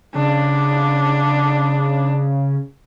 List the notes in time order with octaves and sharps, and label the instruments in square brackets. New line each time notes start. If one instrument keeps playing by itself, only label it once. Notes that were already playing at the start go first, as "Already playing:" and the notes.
[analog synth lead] C#3 [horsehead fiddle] D4